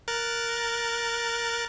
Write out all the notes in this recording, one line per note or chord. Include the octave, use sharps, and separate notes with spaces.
A#4 F#6 A6